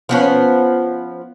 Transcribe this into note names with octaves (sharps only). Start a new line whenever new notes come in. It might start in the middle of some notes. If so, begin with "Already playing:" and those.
F3 B3 C#4